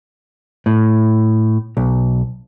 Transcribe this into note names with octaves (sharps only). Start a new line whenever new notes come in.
A2
B1